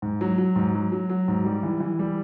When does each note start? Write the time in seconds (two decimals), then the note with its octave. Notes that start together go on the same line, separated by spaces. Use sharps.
0.02 G#2
0.21 F#3
0.38 F#3
0.56 G#2
0.75 F#3
0.92 F#3
1.09 F#3
1.28 G#2
1.45 G3
1.63 E3
1.80 E3
1.99 G3